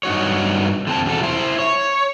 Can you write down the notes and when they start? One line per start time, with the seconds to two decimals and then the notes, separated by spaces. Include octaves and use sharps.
0.03 G2 D#4 F#4 C#5
0.87 D3 C4 A5
1.05 E2 B2 A4
1.23 E4 C5
1.59 C#5